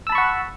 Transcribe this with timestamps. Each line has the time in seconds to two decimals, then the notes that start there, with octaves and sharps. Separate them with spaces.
0.07 E6
0.09 A5
0.12 B5
0.15 C#6
0.18 F#5